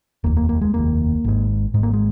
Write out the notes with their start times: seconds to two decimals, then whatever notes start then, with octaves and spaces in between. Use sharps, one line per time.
0.24 F1 D#2 A#3
0.37 A#3
0.49 A#3
0.61 G#3
0.74 F1 D#2 A#3
1.25 G#1 G#2
1.74 G#1 G#2 G#3
1.83 A#3
1.93 G#3